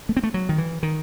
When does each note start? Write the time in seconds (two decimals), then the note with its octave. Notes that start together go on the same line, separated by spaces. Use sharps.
0.09 A3
0.17 C4
0.23 A3
0.34 F#3
0.49 D#3
0.58 E3
0.83 D#3